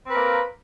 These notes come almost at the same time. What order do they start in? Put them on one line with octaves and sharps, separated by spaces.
C4 B4 A#4 A#3